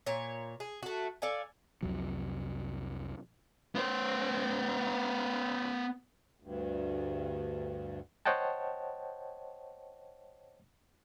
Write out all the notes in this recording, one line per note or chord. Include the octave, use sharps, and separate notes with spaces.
A#2 C#5
G#4
A3 F#4
A4 D5 F5 G#5
C2 F2 C3 F#3
B3 C5
D2 G2
C5 C#5 D#5 F#5 G5 A5